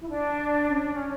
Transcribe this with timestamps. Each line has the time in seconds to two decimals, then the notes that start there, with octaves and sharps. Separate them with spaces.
0.02 E4
0.09 D4
0.66 C#4
0.77 D4
0.93 C#4